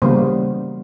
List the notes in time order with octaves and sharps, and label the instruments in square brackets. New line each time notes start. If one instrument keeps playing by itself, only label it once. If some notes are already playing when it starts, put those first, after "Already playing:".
[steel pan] C#3 E3 G3 A#3 B3 C5